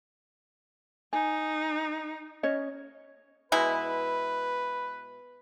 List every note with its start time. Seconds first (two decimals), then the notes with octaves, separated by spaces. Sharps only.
1.13 D#4 G#5
2.43 C#4 C#5 D#5
3.52 B2 G#3 E4 B4